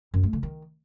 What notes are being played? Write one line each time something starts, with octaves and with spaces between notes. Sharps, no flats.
F#2
A3
D3
D#3